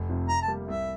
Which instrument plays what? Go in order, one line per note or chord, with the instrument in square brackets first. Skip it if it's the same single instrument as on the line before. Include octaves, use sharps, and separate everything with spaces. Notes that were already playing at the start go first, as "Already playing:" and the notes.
Already playing: [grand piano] F1
F2 C3
[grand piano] C3 [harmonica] A#5
[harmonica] A5
[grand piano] G3 A#3
[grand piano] C2 [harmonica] E5